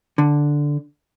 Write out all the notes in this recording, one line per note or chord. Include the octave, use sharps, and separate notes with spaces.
D3